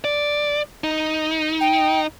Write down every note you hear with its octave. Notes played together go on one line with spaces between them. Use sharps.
D5
D#4
G5